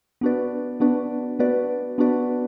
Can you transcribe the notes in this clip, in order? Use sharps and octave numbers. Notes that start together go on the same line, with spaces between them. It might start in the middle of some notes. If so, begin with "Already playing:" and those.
B3 D4 F#4 B4 D5
B3 D4 F#4 B4 D5
B3 D4 F#4 B4 D5
B3 D4 F#4 B4 D5